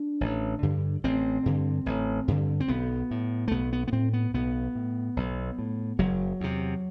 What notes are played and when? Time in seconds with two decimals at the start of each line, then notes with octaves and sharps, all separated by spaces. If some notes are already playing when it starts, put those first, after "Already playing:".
Already playing: D4
0.21 A1
0.63 G2 D3
1.04 A1 C4
1.46 G2 D3
1.86 A1
2.28 G2 D3
2.60 C4
2.68 B1 B3
3.11 A2
3.48 A3
3.51 B1 B3
3.73 B3
3.88 B3
3.92 A2 C4
4.13 B3
4.34 B1 B3
4.75 A2
5.16 B1
5.59 A2
5.99 F#1 F#3
6.41 E2 C3